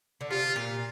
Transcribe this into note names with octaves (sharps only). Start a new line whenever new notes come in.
D3
C3 F4
A#2